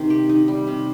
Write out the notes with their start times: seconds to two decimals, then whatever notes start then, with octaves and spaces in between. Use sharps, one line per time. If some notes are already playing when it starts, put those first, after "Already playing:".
Already playing: C3 D#3 C4
0.10 G4
0.29 D#4
0.48 G3
0.67 C3